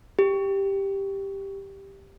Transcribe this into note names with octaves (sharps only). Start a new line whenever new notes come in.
G4